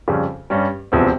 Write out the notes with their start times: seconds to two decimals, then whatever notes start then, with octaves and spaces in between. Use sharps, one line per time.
0.08 F2 C#3 G3
0.50 G2 G3 C#4
0.92 E1 E2 C3 F3 C4